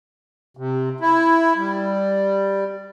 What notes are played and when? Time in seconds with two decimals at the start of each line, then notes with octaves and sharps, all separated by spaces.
0.57 C3
1.00 E4
1.57 G3